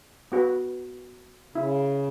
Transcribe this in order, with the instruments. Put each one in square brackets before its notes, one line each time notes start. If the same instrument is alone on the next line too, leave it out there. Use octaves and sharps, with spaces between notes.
[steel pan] B3 F#4 B4
[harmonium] C#3 [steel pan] E4